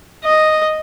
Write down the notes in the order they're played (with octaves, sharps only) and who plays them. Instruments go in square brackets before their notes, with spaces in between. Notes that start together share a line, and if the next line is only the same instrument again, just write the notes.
[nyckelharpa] D#5